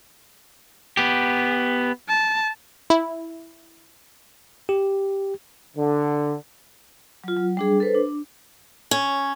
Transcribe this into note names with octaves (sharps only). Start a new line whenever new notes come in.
B3 G4
A5
E4
G4
D3
F#3 F4
F#3
G3 D4 G#4
A4 B4 C5
D4
C#4